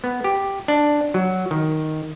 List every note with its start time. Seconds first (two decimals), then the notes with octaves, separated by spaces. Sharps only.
0.04 B3
0.24 G4
0.68 D4
1.14 F#3
1.51 D#3